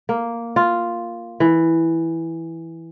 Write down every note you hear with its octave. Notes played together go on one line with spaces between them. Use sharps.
A#3
F4
E3